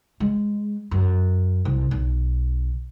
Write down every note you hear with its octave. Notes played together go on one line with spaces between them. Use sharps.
G#3
F#2
C2
B1